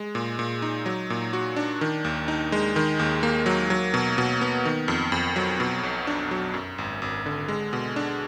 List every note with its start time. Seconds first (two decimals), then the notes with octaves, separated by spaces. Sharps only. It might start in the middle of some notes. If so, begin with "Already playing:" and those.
Already playing: G#3
0.15 A#2
0.39 A#2
0.62 D#4
0.86 F#3
1.10 A#2
1.33 F#4
1.56 D4
1.81 D#3
2.05 D#2
2.28 D#4
2.52 G#3
2.76 D#3
2.99 D#2
3.23 A#3
3.46 F#3
3.70 F#3
3.94 B2
4.18 B2
4.41 B3
4.65 D#3
4.88 F2
5.12 F2
5.36 F#3
5.60 B2
5.83 B1
6.07 D4
6.31 F#3
6.54 F#2
6.78 G#1
7.02 G#1
7.26 D3
7.48 G#3
7.73 B2
7.96 D4